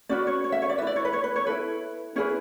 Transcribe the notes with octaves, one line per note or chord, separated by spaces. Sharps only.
C#4 F#4 B4 D5
C#5
C#5
E5
C#5
D5
E4 B4 D5 E5
C#5
B4
C#5
B4
C#5
E4 A4 B4
C#4 E4 G#4 B4 C#5